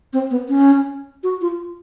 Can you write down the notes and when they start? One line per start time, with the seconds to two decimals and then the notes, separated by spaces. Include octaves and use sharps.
0.13 C4
0.31 B3
0.49 C#4
1.23 F#4
1.41 F4